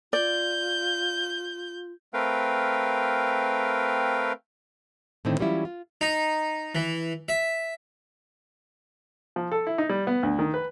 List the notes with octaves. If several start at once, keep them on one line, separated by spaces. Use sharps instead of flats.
F4 D5 G6
A3 C4 A#4 B4 F5 G5
A2 D3 D#3 C4 E4
E3 F#3 G3 C#4 E4 F4
F4
D#4
E3
E5
F3
A4
E4
D#4
G3
B3
D2
D#3
B4